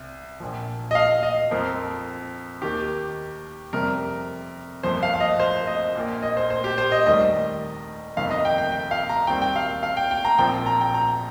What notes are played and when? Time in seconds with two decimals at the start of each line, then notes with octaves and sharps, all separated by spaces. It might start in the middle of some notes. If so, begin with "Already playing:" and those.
Already playing: C2 C3
0.40 A#1 A#2 F3
0.91 D#5
0.95 F5
1.23 D#5
1.51 F2 F3 C4 A#4
2.62 D#2 D#3 A#3 G4
3.73 F2 C3 G3 A#4
4.83 G1 F2 F3 A#3 C5
5.03 F5
5.14 F5
5.20 D#5
5.40 C5
5.67 D#5
5.95 A#1 A#2 A#3
6.23 D#5
6.37 C5
6.50 C5
6.64 G4
6.78 C5
6.92 D#5
7.06 F1 D#2 D#3 G3 D#5
8.16 G1 F2 C3 D#3 F5
8.31 D#5
8.45 G5
8.58 G5
8.72 G5
8.91 F5
9.09 A#5
9.27 D#2 D#3 G3 C4 G5
9.42 G5
9.56 F5
9.83 F5
9.97 G5
10.11 G5
10.25 A#5
10.38 A#1 A#2 F3 C4 G5
10.66 A#5
10.81 G5
10.94 A#5